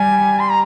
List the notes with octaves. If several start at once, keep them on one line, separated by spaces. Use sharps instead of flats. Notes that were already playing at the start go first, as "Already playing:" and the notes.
Already playing: G3 G4 G#5
C6
A#5